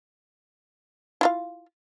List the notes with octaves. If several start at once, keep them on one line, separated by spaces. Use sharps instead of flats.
E4 F4 F5